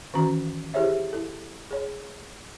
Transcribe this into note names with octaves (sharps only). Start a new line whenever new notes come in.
D#3 E3 C#4 F#4 A#5
E4 G4 G#4 C5 C#5 E5
E4 A4
G#4 C#5